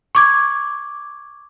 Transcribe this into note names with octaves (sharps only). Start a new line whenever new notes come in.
C#6 D6 G#6